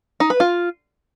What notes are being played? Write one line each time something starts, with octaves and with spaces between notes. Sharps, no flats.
D#4
B4
F4